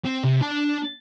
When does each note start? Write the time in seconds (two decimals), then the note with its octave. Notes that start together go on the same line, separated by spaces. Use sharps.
0.05 C4
0.24 C3
0.41 D4 A5